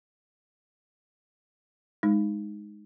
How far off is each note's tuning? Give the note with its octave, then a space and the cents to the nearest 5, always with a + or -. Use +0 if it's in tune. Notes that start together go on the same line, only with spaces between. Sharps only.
G#3 +0 D#4 +0